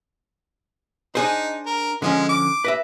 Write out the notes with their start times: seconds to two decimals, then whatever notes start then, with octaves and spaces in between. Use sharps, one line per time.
1.15 D4 D#4 G#4 C5
1.66 A#4
2.02 D3 F3 G#3 C#4
2.29 D6
2.65 B4 D#5 E5